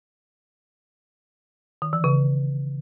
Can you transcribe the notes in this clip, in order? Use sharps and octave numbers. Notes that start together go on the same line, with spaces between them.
D#3
E3
C#3